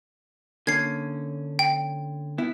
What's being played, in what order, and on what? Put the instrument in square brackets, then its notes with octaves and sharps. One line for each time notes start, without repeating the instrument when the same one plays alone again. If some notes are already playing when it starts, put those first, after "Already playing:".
[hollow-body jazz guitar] D3 A#3 C#4 [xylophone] G#6 C7
[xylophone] G5
[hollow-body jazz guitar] B3 E4